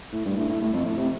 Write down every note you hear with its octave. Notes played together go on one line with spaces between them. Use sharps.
A2
G2
A2
A2
A2
F2
A2
C3